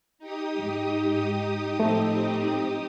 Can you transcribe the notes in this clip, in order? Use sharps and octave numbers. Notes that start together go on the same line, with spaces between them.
D#4 G4 D#6
G#2
A2 F3 A3 C4